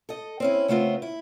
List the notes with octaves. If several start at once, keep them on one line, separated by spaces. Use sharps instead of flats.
A4 D#5
C4 C#4 E4
C#3 A3 B3 C4 F4
E4